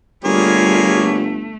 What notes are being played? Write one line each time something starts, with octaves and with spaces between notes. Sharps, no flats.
G1 G3 A3 A#3 F4 G#4 C#5